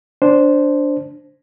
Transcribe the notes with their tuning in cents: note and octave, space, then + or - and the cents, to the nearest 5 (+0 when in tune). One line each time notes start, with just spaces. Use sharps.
D4 -10 C5 +0